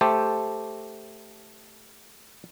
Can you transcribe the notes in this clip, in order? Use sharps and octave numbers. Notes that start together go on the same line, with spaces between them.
A3 G4 A4 C5